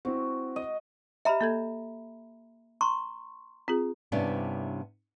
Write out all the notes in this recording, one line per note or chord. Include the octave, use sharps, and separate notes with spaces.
C4 E4 F#4
D#5
G4 D#5 E5 A#5 B5
A#3 A4 G#6
A#5 C6 C#6
C4 F4 G#4
G2 C3 B3 C#4 D4 E4